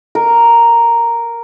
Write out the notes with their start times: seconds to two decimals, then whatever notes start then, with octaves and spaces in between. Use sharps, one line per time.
0.15 A#4